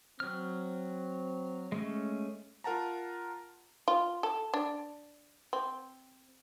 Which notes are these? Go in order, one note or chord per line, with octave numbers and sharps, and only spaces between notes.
F#3 C4 F6
G#3 A3 C#4
F4 A#4 F#5 A5 A#5
F4
A4
D4
C4